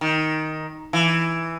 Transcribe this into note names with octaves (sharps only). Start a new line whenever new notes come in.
D#3
E3